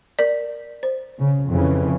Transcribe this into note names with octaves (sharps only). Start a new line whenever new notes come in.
A#4 D5
C5
C#3
F2 C#3 E3